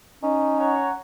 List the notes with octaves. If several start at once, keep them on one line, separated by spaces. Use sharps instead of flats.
C#4 D#4
C#5 F#5 A#5